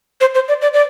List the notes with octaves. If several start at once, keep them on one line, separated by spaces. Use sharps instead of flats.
C5
C5
D5
D5
D5